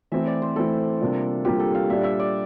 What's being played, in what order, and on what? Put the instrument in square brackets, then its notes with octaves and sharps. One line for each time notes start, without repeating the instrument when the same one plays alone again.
[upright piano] E3 A3 C4 E4 [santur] E5
[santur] D5
C5
[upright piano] E3 A3 C4 E4 [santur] A4
[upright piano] C3 G3 A#3 D4 F4
[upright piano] C3 G3 A#3 D4 F4 [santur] G4
[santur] A4
F5
[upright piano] A#2 G3 D4 [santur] E5
[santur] E5
D5